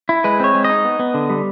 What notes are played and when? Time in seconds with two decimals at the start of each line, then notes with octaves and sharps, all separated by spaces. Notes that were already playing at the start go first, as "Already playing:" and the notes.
0.09 E4
0.24 G#3 B4
0.40 C4 C#5
0.55 G#3
0.64 D#4 D#5
0.84 B3
0.99 B3
1.14 D3
1.30 G3